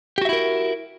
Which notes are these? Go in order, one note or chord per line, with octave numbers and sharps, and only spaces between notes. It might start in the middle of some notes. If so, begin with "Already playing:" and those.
E4 F#4 G4 A#4 E5